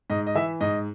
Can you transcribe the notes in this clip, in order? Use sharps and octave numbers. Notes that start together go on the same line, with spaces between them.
G#2 D#5
D#5
E3 E5
G#2 D#5